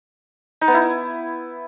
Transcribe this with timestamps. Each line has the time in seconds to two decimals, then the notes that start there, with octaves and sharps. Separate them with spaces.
0.61 D#4
0.68 B3
0.74 E4